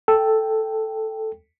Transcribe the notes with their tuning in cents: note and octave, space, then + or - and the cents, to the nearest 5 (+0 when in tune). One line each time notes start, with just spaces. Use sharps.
A4 +0 G5 +0